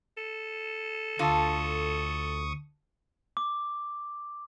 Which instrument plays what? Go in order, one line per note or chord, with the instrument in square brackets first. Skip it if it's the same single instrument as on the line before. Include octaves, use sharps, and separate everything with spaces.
[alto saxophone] A4
[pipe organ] D2 C#6 D#6 [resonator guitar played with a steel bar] D3 F4 [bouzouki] A5
[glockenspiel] D6